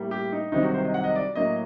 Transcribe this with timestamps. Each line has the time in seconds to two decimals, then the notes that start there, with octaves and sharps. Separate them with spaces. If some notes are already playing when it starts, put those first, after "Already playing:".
Already playing: A2 G3 A#3
0.11 G4
0.32 D#4
0.52 C2 C3 D#3 F#3 D#4
0.63 F#4
0.74 C5
0.84 D#5
0.94 F#5
1.04 D#5
1.15 D5
1.36 A2 F#3 A#3 D#5